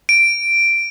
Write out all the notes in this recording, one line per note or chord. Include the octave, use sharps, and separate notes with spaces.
D7